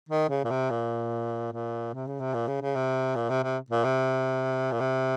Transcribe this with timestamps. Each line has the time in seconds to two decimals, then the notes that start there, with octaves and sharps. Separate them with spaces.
0.09 D#3
0.29 C#3
0.44 A#2
0.50 C3
0.70 A#2
1.53 A#2
1.93 C3
2.07 C#3
2.20 C3
2.34 A#2
2.48 C#3
2.61 C#3
2.76 C3
3.15 A#2
3.30 C3
3.43 C3
3.70 A#2
3.84 C3
4.72 A#2
4.80 C3